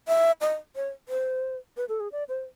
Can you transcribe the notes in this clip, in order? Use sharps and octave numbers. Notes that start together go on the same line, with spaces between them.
E5
D#5
C#5
C5
B4
A4
G#4
D5
C5